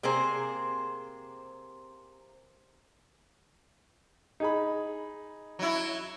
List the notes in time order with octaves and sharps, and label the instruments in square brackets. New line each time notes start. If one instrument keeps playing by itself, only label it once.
[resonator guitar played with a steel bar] C3 A#3 C4 G#4 C5
[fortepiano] D#4 G#4 B5
[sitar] F#3 E4